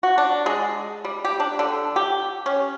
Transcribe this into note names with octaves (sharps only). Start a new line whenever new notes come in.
F#4
D4
G#3
G3
G4
D4
D3
G4
C#4